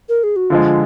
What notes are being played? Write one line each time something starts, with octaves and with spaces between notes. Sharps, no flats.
A#4
G#4
F#4
D3 F3 G#3 F4